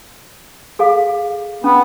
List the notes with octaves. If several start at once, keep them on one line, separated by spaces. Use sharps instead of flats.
G#4 A4 F5
B3 C#4